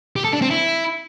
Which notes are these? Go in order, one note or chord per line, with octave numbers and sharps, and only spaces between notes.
G4
A4
D4
C4
E4